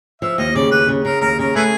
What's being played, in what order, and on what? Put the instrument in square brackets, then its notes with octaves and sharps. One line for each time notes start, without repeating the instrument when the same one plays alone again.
[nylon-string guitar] F3 [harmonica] E5
[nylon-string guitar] D#2 [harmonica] D#5
[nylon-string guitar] C#3 [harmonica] D5
[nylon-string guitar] D#2 [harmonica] B4
[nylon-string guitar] C#3
[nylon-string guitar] C#3 [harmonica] A#4
[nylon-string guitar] D#2 [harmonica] A#4
[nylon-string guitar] C#3 [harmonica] A#4
[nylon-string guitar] A3 [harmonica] B3 E4 G#4